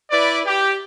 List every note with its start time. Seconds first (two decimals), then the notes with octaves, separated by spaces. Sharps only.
0.11 E4 B4 D5
0.46 G4